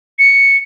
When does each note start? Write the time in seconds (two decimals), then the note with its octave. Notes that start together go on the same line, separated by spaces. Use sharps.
0.19 C#7